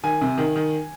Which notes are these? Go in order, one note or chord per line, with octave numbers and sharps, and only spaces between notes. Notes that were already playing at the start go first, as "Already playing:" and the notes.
D#3 G#5
C3
D#3
D#3